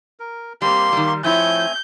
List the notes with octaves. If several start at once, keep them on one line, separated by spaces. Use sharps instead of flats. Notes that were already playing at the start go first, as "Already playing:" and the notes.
A#4
G3 A#3 C4 G4 C6
D#3 G3
F3 A3 C4 E4 C#5 G#5 G6